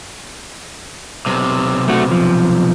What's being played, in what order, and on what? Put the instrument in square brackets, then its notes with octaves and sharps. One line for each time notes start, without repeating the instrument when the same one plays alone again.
[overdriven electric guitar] B1 C3
[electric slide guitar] A3 F#4
F3